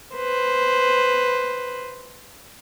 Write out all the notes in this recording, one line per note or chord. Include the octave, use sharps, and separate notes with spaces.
B4 C5